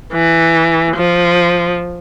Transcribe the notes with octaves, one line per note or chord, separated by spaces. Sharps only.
E3
F3